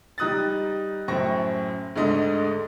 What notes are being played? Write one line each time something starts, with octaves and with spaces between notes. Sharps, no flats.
G3 D#4 D#6 F#6 A6
F#2 A2 C5 G5 C#6 A#6
D2 G#2 D3 D#5